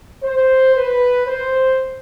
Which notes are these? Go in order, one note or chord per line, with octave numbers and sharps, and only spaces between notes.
C5
B4
C5